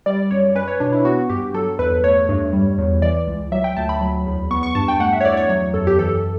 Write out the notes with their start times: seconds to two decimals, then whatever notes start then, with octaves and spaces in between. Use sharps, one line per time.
0.06 G3 D5
0.31 F#2 C#5
0.55 C#4 B4
0.68 C#5
0.80 B2 D4
0.93 E4
1.05 B3 F#4
1.30 G2 G4
1.54 F#3 A4
1.79 E2 B4
2.04 A3 C#5
2.29 G2
2.53 G3
2.78 E2
3.02 E3 D5
3.27 C#2
3.52 F#3 E5
3.64 G5
3.76 D2 A5
3.89 B5
4.01 F#3
4.26 E2
4.51 B3 C#6
4.63 C#6
4.75 G2 A5
4.88 G5
4.99 A3 F#5
5.13 E5
5.21 C#5
5.25 E2 D5
5.37 C#5
5.49 F#3 C#5
5.74 F#2 A4
5.87 G4
5.99 E3 A4